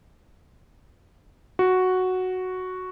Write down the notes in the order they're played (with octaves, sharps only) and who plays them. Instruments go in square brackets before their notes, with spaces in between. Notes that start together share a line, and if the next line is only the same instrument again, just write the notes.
[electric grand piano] F#4